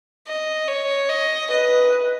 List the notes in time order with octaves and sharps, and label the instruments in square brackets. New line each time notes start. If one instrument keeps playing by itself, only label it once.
[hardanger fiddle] D#5
C#5
D#5
[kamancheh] B4 [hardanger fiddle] D#5